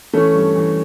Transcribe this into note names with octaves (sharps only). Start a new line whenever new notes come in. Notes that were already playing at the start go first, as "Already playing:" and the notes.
E3 A3 C#4
G2
E3